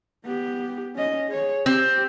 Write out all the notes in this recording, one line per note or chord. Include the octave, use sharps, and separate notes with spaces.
B3 G4
C#4 D#5
G#4 C#5
C4 G4